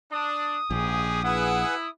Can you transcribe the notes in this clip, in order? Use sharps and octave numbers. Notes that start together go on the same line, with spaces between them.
D4 D#6
A#1 G#2 G#3 G4 G#4
E4 G#4 B4 F#5